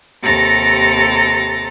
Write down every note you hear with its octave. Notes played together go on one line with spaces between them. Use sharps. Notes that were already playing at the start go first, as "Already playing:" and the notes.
D#2 C3 A4 A#5 A6 A#6